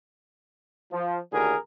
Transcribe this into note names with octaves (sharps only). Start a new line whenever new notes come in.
F3
D#2 A2 D3 F#4 G#4 A#4